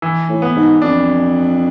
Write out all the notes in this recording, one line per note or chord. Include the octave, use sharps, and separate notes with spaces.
E3
A2
B3
G#2
F2 D4